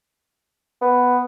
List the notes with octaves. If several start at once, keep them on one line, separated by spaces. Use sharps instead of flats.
B3